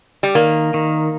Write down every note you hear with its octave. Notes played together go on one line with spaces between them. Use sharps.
G3
D#3 A#3
D#3